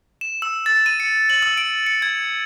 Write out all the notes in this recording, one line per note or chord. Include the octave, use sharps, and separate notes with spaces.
E7
E6
A6
D#7
C#7
F#7
E6
D7
C#7
G#6